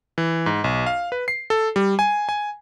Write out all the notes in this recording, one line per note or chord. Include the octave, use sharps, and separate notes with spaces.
E3
G#2
B1
F5
B4
C7
A4
G3
G#5
G#5